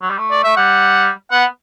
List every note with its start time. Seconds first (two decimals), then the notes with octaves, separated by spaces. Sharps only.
0.02 F#3
0.10 G3
0.18 A3
0.31 D5
0.44 A3 E5
0.57 G3 F#5
1.31 B3 F#5